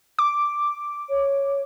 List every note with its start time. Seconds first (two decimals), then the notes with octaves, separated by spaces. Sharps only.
0.19 D6
1.10 C#5